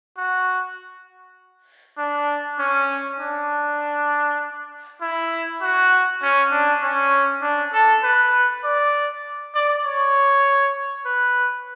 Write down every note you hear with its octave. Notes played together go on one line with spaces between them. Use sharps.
F#4
D4
C#4
D4
E4
F#4
C#4
D4
C#4
D4
A4
B4
D5
D5
C#5
B4